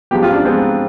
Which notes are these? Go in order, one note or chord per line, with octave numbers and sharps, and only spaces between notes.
G#2 F3 G#3 B3 G4
F4
D4
G#2 F3 G#3 B3 C4